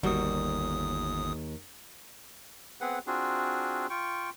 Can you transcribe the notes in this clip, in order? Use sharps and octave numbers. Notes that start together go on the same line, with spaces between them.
G1 D#2 G3 F#4 D#6
B3 C4 G#4 B4 F#5
C4 D4 F4 F#4 G#4
F4 G5 C#6